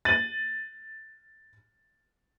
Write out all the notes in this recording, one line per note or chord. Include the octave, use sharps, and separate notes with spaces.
A6 D#7 F#7